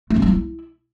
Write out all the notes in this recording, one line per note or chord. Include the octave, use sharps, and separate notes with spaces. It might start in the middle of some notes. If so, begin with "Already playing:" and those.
A3
C#4
F#3
E4